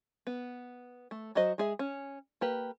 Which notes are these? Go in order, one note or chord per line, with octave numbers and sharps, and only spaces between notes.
B3
A3
F#3 F#4 C5 D#5
G#3 G#4 E5
C#4
A#3 G4 B4